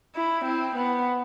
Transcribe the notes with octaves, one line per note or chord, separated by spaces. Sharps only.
E4
C4
B3